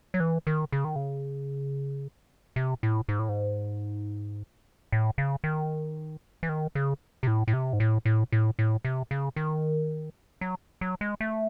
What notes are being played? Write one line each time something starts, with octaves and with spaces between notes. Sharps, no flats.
F#3
E3
D#3
C#3
D#3
C#3
C3
A2
G#2
A2
G#2
A2
C#3
D#3
E3
D#3
C#3
C3
A2
A2
C3
G#2
A2
A2
A2
A2
C3
C#3
D#3
F#3
F#3
G#3
A3